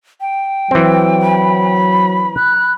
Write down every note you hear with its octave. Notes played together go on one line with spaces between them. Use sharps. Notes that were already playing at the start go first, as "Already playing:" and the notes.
G5
E3 F#3 C4
B5
F#6